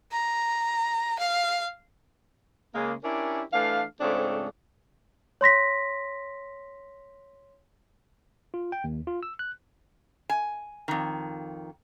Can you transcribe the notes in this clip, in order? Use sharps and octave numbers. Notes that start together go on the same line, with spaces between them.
A#5
F5
C#3 G#3 A#3
C#4 D4 E4 G4 A#4
E3 A3 D4 F5
F2 G#2 C#3 A3 C4 D4
C#5 C6 A#6 B6
F4
G5
D#2
F4
E6
F#6
G#5
F2 D#3